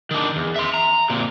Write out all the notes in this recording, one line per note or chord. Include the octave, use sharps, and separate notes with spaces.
D#3 D4
E2
E5 C6
A#5
A#2 C4